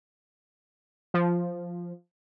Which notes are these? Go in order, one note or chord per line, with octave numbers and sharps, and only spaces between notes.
F3